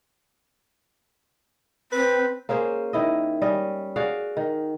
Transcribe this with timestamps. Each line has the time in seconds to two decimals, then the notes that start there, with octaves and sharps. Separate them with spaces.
1.92 C4 B4
2.49 A#3 C#4 G#4 C5
2.93 D#3 E4 D#5
3.41 G3 C#4 D#5
3.96 F#4 G#4 D5 F5
4.37 D#3